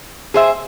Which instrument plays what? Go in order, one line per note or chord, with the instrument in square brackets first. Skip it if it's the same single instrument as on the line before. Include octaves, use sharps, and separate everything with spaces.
[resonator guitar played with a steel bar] G#4 C5 E5